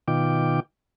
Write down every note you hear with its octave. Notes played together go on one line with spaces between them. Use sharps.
B2 D#3 F4 G5 D6